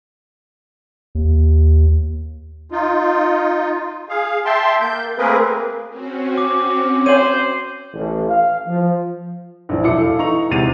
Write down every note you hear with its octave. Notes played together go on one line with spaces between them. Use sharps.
D#2
D#4 F4
G#4 F5
E5 G5 A5 C6
A#3 G6
A3 A#3 C4 G#4 A#4 B4
C4 C#4 F#4
D6
C5 C#5 G#5 D#7 F#7
A1
F5
F3
A#1 F#2 E3
E1 E3 E4 D6 C#7
A4 F5
E3 D#4 A#5 C#6 F7
E2 G#2 C3 A6 D#7 F7